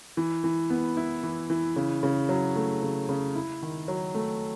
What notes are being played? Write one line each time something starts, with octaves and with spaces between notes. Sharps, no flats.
E3
E3
B3
E4
E3
E3
C#3
C#3
F#3
A3
C#3
C#3
E4
D#3
F#3
A3